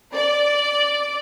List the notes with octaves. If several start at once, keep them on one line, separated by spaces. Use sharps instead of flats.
D5